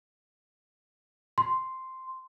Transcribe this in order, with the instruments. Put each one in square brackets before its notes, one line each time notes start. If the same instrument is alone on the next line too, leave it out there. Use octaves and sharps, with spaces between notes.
[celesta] C6